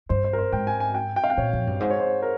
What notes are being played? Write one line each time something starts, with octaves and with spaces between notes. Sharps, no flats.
G2 C5
C5
A#4
C5
G#2 G5
G#5
G#5
G5
G5
F5
G5
A#2 C#5
F2
G2
G#2 C5
C#5
C5
A#4